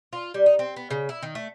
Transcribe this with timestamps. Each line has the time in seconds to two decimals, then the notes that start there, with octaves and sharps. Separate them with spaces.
0.13 F4
0.34 G3
0.46 D#4
0.59 C4
0.76 B3
0.91 C#3
1.09 E4
1.22 D#3
1.35 A3